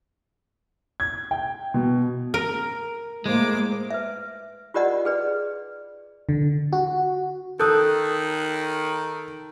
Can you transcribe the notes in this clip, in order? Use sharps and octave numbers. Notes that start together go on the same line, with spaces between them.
G#6
G5
B2
A#4
A2 G#3 A#3 C5 D6
B4 E5
F4 G4 A#4 D5 D#5 F#5
G#4 B4 D5
D3
F#4
D#3 A4 D#6 F#6 G6